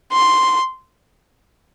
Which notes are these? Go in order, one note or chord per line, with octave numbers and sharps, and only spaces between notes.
C6